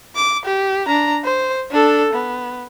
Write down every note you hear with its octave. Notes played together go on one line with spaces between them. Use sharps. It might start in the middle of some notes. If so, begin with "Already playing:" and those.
D6
G4
D4 A#5
C5
D4 A4
B3